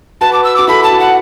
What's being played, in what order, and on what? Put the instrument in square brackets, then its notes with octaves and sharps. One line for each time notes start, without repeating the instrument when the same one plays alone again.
[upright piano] F#4 B4 [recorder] A5
[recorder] D6
E6
[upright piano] F#4 [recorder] D6
[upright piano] E4 A4 [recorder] B5
[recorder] A5
[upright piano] F#4
[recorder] F#5